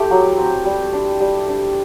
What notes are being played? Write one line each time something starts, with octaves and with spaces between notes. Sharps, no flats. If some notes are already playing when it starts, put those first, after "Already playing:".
Already playing: A3 E4 G4
F#3
C4
G3
D4
G3
D4